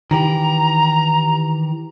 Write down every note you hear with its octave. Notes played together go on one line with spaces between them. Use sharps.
D#3 E3 G4 A#5